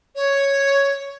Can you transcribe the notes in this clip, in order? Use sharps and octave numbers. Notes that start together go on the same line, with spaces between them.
C#5